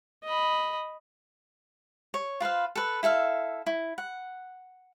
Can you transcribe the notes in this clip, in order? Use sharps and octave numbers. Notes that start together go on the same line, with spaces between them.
D#5 B5
C#5
F4 B4 C5 F5
A4 B4
E4 A4 E5 F5
E4
F#5